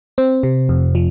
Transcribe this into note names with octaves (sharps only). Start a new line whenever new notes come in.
C4
C3
F2
F3